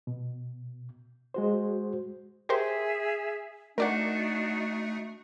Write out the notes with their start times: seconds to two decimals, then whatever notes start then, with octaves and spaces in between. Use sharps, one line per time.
0.07 B2
1.34 G#3 F#4 C5
2.49 G4 G#4 A#4 C5 E5
3.78 A3 D4 D#4 F#4 A#4 D5 F#5